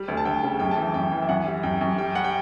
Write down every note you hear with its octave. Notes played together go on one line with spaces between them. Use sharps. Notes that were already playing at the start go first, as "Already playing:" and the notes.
Already playing: G3
D2
A5
D2 G5
C#3
F#2 G5
A5
E3
G5
F#2 G5
E3
E5
F#2 F#5
G3
F#2 G5
F#2
G3 G5
G3 F#5
G5